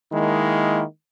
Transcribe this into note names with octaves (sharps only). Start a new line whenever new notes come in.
D#3 G#3 A#3 E4